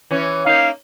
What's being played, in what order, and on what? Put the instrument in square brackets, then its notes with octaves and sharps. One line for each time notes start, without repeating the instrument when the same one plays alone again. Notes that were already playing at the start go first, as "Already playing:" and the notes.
[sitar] E3 C#4
[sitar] A#3 D#4 [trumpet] F5